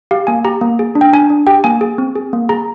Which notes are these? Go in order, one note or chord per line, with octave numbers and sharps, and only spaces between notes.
G4 F5
A#3 G#5
G4 A#5
A#3
G#4
D4
G5
D4 G#5
D4
G4 G5
A#3 G#5
G#4
C4
G#4
A#3
G#4 A#5